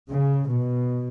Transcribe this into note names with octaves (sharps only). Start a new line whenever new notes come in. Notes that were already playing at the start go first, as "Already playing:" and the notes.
C#3
B2